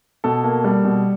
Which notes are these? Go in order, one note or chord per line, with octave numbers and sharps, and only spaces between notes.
B2 A4
A#3
G3
B2